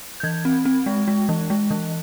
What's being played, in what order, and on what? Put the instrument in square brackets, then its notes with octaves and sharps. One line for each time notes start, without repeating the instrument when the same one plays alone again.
[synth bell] G6
E3 G#6
C4
C4
G#3
G#3
E3
G#3
E3